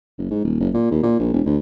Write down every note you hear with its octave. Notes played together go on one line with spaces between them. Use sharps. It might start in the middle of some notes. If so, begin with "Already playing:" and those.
F#1
G#2
D#1
F#1
A#2
D#2
A#2
A#1
E1
D2